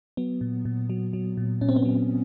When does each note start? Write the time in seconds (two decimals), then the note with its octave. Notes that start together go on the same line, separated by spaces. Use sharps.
0.17 F#3 B3
0.41 A#2
0.65 A#2
0.90 F#3
1.13 F#3
1.37 A#2
1.61 A#2 C#4
1.69 C4
1.76 B3
1.83 F#3 C4